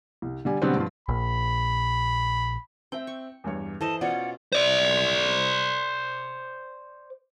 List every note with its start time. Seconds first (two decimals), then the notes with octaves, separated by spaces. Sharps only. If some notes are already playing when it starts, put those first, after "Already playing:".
0.22 C2
0.45 D3 G3 G#5
0.62 B2 D3 F#3 G3 B3 C4
0.76 G2 F3 F4
1.09 A#1 B5
2.92 C4 E5 G5
3.07 C#6
3.44 E2 G2 C#5
3.81 E3 A4 C5 D#5 A5
4.01 B2 C#4 F4 C#5 D5 F#5
4.52 C5 D5